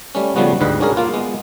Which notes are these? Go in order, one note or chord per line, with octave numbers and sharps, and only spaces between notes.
G3 A3 C#4
C#3 F3 G3 A3 B3 F#4
D2 G#2 G3 B4 D#5
C#4 D4 F#4 G#4 A#4
A#3 F4
G#3 B3